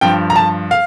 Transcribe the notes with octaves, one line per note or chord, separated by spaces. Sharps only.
G2 F3 G5
A#5
A5
F5